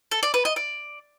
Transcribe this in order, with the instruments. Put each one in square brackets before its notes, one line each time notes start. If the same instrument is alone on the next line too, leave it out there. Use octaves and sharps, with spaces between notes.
[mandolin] A4
D5
B4
D#5
D5